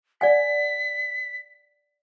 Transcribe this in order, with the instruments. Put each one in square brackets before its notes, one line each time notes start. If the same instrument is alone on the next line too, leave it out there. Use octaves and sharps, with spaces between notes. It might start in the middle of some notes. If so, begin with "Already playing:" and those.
[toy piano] D5 F#5 G#5 [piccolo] B6